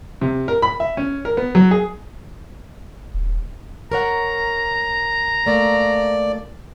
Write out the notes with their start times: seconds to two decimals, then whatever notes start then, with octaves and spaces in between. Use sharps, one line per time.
0.21 C3
0.48 A#4
0.62 B5
0.80 E5
0.97 C#4
1.25 A#4
1.37 B3
1.55 F#3
1.71 G#4
3.14 D#1
3.92 A#4 C#5 F#5 A#5
5.46 A3 A#3 D5